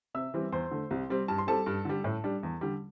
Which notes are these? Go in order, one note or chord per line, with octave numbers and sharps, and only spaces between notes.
C3 E5 E6
E3 G3 C4
E2 C5 C6
D3 A3
C2
C3 G3 C4
G2 A5
C6
G3 C4 A4 A5
G2
D3 G3
A2
G3 D4
E2
D3 G3